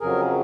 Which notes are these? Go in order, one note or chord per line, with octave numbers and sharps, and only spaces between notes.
F2 C#3 F#3 G#4 A#4